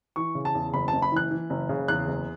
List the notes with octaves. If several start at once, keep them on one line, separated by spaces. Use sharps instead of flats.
E3 C#6
C#3
A5
E2
F#1 B5
F#1 A5
B5
E3 F#6
E3
F#1
C#3
E2 F#6
F#1